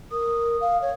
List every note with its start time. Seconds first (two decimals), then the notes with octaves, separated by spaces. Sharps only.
0.11 A#4 D#6
0.61 F5
0.82 C#5